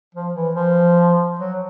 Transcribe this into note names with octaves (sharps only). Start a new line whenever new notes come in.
F3
E3
F3
F#3